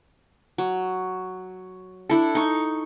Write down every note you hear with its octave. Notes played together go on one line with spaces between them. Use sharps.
F#3
D4 E4 A4
D#4 C#6